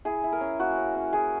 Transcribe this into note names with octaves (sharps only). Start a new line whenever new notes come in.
E4 G#4
E4
A#4
C#4
A#3 F#4
C#4
C#4
E4 G#4